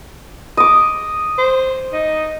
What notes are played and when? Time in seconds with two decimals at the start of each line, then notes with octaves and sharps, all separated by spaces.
0.57 D#5 D6
1.38 C5
1.93 D#4